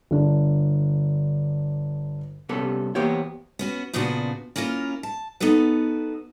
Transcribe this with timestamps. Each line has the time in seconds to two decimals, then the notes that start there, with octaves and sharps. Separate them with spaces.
0.11 G1 D4
2.49 C2 C3 G3 B3 C#4 A4
2.95 E3 A#3 B3 G4 C5 C#5
3.59 B3 C#4 F#4
3.93 A#2 C#3 F3 B3 D4 F#4
4.56 A#3 C#4 E4 F4 A#4
5.03 A5
5.40 B3 D#4 F#4 A4 B4